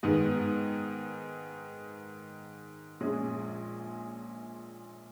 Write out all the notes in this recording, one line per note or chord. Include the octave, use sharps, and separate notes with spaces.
G#2 D#3 G#3 B3
A#1 A#2 G#3 C#4 G#4